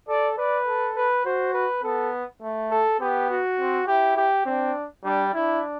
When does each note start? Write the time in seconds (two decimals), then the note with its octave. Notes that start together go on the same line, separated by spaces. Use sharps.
0.08 A4 D5
0.37 B4 D5
0.67 A4
0.96 B4
1.25 F#4 C5
1.54 B4
1.83 B3 A4
2.42 A3
2.71 A4
3.00 B3 G4
3.30 F#4
3.59 C4
3.87 E4 G4
4.17 G4
4.46 C4 D4
5.04 G3 D4
5.33 D4 E4